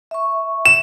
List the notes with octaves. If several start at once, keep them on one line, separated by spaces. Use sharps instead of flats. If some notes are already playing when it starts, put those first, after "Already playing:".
E5 C#6
E7